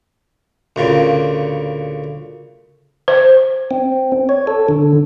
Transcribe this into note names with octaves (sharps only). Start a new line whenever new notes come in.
D2 A#2 C#3
C5
C4
C#5
A4
D3